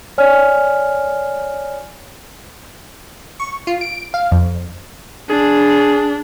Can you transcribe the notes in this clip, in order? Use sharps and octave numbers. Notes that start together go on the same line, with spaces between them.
C#5 D5 G#5 F6
C#6
F4
D7
F5
F2
D4 G#4